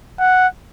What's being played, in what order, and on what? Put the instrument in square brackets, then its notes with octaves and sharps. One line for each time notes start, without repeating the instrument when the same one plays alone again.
[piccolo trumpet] F#5